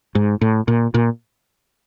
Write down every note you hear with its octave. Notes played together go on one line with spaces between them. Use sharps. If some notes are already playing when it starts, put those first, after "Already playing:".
G#2
A2
A#2
A#2